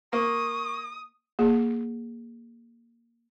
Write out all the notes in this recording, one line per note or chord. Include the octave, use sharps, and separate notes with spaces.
A#3 C#6 D#6
A#3 G#4